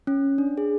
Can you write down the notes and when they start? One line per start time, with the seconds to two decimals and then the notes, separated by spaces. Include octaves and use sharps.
0.07 C#4
0.38 D4
0.58 G#4